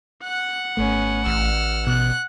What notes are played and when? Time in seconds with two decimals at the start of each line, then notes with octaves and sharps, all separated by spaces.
0.24 F#5 F#6
0.77 G#1 A3 B3 C#4
1.26 A1 E6 F6
1.87 B2 F#6